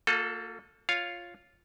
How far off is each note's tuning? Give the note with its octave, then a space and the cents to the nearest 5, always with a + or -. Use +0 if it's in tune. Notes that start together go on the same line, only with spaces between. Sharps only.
A#3 -40 F4 +40 A4 +0
F4 +0 C#5 +0 F5 +0